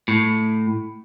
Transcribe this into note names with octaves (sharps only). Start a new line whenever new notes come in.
A2